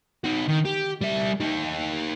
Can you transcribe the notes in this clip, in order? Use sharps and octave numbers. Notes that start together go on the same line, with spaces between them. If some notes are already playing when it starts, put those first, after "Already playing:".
D#4 F#4
D#3
G4
G3 E5
D#4 G4